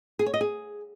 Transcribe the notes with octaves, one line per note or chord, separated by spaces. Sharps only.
G#4
C#5
D#5
G#4